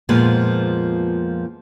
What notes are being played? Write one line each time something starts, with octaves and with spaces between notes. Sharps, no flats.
F2 A#2 F3 G#3 B3